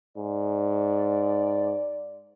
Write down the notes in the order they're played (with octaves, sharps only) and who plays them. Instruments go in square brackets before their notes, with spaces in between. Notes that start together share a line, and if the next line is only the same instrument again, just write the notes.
[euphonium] G#2 [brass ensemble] D5